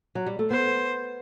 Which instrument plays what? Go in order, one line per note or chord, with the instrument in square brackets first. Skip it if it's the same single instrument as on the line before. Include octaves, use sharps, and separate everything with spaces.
[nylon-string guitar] F#3
G3
A3
[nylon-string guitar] B3 [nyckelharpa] C5